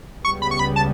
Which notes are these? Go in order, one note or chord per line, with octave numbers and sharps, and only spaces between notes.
C#2 C#3 G3 B3 C#6
B5
C#6
B5
A5